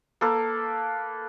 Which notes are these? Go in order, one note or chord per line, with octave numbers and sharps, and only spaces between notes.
A#3 A4 B4